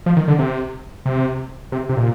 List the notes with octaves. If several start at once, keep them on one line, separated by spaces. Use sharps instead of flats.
F3
D#3
D3
C3
C3
C3
C3
A#2